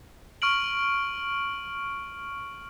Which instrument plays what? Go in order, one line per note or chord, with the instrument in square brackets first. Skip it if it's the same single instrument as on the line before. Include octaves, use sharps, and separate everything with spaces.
[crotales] C#6 F6 D7 F#7